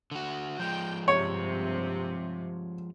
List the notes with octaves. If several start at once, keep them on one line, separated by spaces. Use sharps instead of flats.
D3 F#4
F3 G#3 G5
G2 C3 C#5